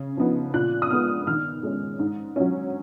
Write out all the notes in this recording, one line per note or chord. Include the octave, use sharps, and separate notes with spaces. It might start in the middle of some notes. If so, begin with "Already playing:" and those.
Already playing: C#3
F3 B3 D#4
A#2 F#6
D#6
G#3 B3 D#4 F6
D#3 F6
G#3 C#4
G#2
F#3 C#4